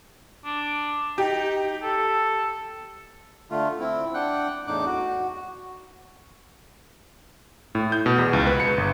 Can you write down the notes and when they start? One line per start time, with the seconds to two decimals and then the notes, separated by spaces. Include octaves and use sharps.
0.45 D4
1.18 D#4 G4
1.83 A4
3.51 D3 A3 F4
3.79 C4 E4
4.14 D4 F#5 G5 F#6
4.67 E2 A2 D4 D#4 D6 F#6
4.85 F#4
7.75 A2
7.92 G6
8.06 B2
8.18 E2
8.33 C#2
8.47 B4
8.60 C#7
8.78 G1